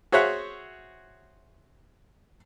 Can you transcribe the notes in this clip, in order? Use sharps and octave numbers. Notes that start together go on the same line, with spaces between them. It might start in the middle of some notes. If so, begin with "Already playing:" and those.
F#4 G#4 C5 C#5 E5 F#5